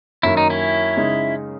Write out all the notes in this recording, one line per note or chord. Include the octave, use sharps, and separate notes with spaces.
F#2 D#3 A#3 E4
D#4
C#4 E4
C#3 G#3 D#4